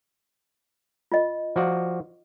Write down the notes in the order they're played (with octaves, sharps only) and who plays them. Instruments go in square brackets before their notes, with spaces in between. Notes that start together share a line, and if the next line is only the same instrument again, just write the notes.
[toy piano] F4 D#5
[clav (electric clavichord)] F3 F#4 D5